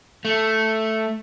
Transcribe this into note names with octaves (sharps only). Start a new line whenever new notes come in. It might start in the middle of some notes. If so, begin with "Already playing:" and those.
A3